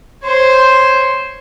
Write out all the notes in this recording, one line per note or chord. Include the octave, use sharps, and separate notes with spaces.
C5 C#5